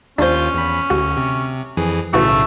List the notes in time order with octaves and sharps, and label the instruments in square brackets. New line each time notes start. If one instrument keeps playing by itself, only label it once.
[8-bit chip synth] D#2 F4 G6 [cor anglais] C#4 [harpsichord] D4 C5
[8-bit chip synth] E2 B5
[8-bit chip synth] D2 [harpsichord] F#4
[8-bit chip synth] C3
F2 E3 G#4
[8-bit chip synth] B1 A2 C#3 [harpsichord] E3 F#4 C#6 [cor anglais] A3